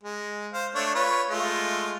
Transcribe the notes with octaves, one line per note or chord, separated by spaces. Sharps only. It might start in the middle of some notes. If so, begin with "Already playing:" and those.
G#3
C5 F5
A3 D4 C#5
F4 B4 C#5
G#3 A3 F4